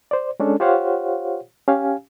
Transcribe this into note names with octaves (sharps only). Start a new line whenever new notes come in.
C5 D5
G#3 C#4 D4 A4
F4 G4 C5 C#5 F5 F#5
C#4 G4 F5 G#5